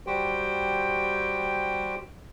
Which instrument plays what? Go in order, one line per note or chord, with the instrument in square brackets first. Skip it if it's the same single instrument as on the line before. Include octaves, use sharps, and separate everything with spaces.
[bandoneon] G3 F#4 G4 C5 G5